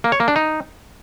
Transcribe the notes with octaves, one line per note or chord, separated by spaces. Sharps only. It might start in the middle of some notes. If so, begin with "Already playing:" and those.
A#3
C#5
A#3
D4
D#4